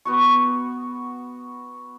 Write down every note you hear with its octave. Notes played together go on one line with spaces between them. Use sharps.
B3 F#4 C#6